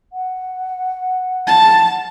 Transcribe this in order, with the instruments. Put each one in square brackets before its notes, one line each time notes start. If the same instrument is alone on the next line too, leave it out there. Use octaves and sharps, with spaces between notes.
[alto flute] F#5
[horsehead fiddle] A5